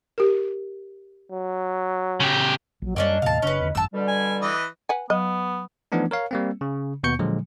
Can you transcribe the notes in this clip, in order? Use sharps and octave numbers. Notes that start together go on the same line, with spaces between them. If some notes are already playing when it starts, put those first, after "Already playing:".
G4 A#4
F#3
C#3 G4
A#1 F#3
F#2 F3 G3 A#3 C#4 D4 D#5
D#2 A2 C3 F5 A5
F#1 C#3 C#4 D4 B4
E2 D3
G#1 F#2 A5 E6
B2 D3 G3
G#5
E3 B4 D#5
B4 F#5 G#5
F#3 B3 D#5
E3 F3 A3 B3 D4 D#4
A#4 C#5 F5
G3 A#3 C4
C#3
D#2 B2 B3 C#6 G6 C#7
A#2 D3 F3 F#3 G#3